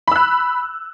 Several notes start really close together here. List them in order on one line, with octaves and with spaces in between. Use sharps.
B5 E6 F#6